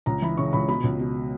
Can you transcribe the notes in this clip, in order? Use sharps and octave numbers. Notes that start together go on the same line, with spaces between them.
C#2 A#5
E3 B5
C#3 C#6
C#2 B5
B2 B5
C#2
B2